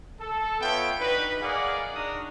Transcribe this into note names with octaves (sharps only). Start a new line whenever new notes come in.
A4
B3 F4 C#5 E5 G5
D4 D#4 F#4 B4
G#4 A#4 D5 D#5 F5 F#5
D4 D#4 F#4 A#5 D#6